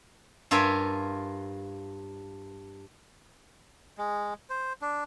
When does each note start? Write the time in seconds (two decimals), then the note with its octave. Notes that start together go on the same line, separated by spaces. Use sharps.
0.51 G2 F4 A#4 C#5 E5 G#5
3.98 G#3
4.50 C5
4.82 D4